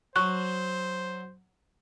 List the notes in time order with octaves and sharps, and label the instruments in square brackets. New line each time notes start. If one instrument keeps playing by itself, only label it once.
[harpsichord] F#3 [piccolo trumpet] C5 [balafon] C#6 [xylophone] F#6